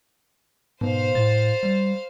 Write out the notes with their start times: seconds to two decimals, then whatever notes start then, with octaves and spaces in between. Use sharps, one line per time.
0.81 G#2 B2 C5 F5
1.15 A2 A6
1.63 G3